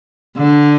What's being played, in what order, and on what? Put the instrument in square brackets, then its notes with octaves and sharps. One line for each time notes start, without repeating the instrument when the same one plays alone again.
[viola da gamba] D3